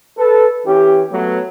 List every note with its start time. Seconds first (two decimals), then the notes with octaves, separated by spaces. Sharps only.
0.18 A4 B4
0.66 E3 C#4 G4
1.12 F#3 A3 B3